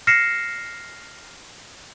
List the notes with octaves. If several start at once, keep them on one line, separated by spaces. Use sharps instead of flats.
F6 A#6 C7 C#7 E7